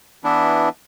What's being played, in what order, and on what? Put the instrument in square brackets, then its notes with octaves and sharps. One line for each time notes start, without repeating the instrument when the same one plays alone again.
[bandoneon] E3 B3 D4 E4